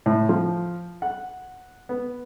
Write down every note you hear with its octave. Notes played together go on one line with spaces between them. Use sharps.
A2
F3
F#5
B3